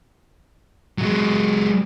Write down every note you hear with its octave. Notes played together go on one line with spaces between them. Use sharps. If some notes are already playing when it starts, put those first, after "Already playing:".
F#3 G#3